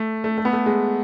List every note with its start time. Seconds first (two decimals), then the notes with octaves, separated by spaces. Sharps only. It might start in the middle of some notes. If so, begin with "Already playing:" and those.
Already playing: A3
0.24 A3
0.38 A3
0.45 B3
0.53 A3
0.66 G#3